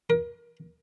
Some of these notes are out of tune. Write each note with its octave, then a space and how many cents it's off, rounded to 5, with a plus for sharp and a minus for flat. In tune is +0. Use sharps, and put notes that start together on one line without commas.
A#4 +30